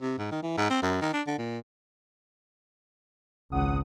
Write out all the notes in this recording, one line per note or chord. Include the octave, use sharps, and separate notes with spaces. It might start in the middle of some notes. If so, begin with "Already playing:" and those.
C3
G#2
D#3
E3
G#2
C4
F#2
D#3
D4
D3
A#2
G#1 C#2 F#5 D#6